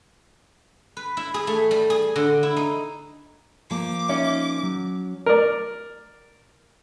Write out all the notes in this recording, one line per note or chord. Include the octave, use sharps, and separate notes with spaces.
B4
E4
G#4
A3
G3
G#4
D3
E4
D#4
F3 A#3 D6
C#4 D#4 E5
F#3
A#4 D5